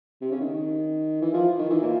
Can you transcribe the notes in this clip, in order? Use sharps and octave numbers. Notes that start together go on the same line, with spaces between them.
C3
C#3
D#3
E3
F3
D#3
E3
A#2